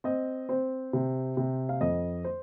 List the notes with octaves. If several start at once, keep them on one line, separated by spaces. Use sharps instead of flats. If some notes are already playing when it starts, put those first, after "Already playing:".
C4 D#5
C4 C5
C3
C3
F5
F2 D#5
C5